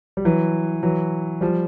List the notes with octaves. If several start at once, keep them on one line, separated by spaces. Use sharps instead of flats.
G3
E3 F#3
E3 F#3
F3 G3